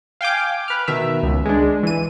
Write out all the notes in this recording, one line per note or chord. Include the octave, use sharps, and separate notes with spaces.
F5 G5 G#5 D6
B4 F6
B2 D#3 E5
C#2
G#3 D4
E3 D#7